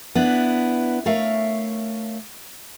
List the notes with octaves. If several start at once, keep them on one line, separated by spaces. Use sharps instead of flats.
B3 D4 E4
A3 A#4 C#5 E5 F5